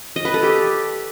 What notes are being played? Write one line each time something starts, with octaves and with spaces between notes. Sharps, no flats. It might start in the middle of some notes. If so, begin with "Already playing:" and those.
D#5
B4
A4
G4